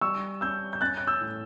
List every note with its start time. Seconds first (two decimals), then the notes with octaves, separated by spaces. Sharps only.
0.01 G3 C#6 E6
0.41 C#4 E6 G6
0.73 G6
0.81 C#4 F#6 A6
0.98 F#6
1.07 E6 G6
1.21 A2